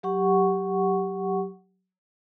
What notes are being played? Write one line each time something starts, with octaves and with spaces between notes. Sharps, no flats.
F#3 G4 F#5 C#6